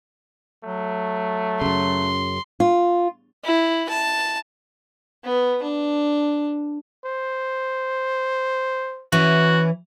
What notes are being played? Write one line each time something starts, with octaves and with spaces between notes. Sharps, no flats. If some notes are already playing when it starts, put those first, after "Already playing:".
F#3 A3
F#2 C#3 C6
F4
E4
A5
B3
D4
C5
E3 C#4 E4 F#4